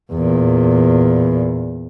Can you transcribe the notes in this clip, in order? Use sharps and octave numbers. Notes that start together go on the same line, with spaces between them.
E2 A#2